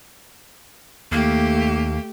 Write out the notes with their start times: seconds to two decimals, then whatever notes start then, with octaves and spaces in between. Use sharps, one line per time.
1.12 D#2 A3 A#3 G4